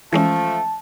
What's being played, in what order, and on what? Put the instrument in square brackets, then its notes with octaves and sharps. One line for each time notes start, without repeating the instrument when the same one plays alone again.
[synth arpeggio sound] E3 G#3 C#4 [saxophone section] F3 A3 [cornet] A5